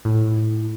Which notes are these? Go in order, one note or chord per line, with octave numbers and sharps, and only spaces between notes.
A2